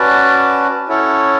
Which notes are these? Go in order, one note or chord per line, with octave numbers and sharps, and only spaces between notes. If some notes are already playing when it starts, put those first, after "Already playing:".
Already playing: C#4 F#4 B4 D5 A5
C#4 E4 A4 C#5 F#5